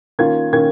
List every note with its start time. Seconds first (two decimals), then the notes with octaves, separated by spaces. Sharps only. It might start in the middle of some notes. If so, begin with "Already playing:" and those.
0.19 D#3 A#3 C#4 F4 G#6
0.53 D#3 A#3 C#4 F4 G#6